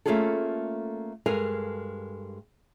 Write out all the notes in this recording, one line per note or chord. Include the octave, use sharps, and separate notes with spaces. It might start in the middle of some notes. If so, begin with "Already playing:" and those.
A3 A#3 C#4 F4 G#4 A4
G2 G#3 A4 A#4 F5 G#5